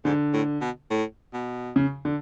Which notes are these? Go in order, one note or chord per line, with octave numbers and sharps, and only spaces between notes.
G#2 D3
A2
B2
A2
B2
C#3
D3